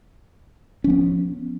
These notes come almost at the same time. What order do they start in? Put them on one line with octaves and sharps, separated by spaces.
C#4 F3 B3